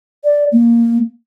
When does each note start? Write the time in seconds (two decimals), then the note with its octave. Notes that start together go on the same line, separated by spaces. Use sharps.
0.24 D5
0.52 A#3